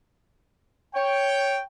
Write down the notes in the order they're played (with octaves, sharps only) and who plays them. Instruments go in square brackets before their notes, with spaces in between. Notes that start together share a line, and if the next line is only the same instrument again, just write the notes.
[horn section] C#5 [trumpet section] G5